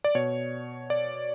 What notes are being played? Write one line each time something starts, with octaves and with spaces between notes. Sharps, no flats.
D5
B2 C#5
D5